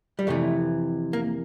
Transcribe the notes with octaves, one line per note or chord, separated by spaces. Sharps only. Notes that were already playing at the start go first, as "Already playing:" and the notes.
G3
F2 C3 E3 A3
A#3